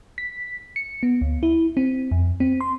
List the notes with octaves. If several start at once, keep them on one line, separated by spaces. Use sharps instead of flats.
B6
C#7
B3
D2
E4
C4
F2
C4
C6